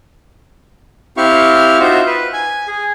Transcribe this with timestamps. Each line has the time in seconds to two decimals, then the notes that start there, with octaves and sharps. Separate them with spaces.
1.17 C4 E4 G4 F5 C#6 F6
1.80 D#4 F4 F#4 C5 E5
2.06 B4
2.33 G#5
2.67 G#4